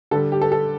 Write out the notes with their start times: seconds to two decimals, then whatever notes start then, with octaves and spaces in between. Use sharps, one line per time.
0.11 D3 G3 A4
0.32 G4
0.41 A4
0.52 A4